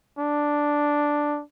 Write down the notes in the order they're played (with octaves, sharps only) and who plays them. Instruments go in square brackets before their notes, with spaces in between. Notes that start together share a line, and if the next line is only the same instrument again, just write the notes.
[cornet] D4